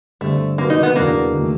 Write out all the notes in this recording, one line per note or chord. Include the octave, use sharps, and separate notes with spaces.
G2 D3 G3 A3 C4
C3 D#3 F#3 A#3 B3
D#4
B3
E2 B2 F#3 A#3 B3 D4
D#3 F#3 A3